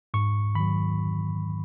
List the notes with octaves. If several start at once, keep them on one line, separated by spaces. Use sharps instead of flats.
G#2 C#6
D#3 F#3 B5